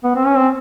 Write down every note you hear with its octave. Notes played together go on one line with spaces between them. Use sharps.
B3
C4
C#4
C4